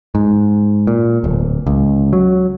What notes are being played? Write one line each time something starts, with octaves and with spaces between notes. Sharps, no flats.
G#2
A#2
D1
C#2
F#3